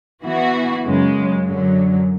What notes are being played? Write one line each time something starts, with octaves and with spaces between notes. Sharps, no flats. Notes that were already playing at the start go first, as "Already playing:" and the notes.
E3 B3 F#4
F#2 C#3 G#3
F#2 D3 F#3